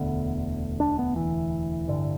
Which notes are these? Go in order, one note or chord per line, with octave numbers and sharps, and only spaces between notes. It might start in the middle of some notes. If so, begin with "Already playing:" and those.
Already playing: E1 D2 D3 B3
D4
B3
E3
A1 G2 D3